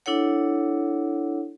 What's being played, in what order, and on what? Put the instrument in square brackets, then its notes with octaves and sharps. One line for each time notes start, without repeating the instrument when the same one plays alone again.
[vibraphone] D4 E4 A4 C#5 F#5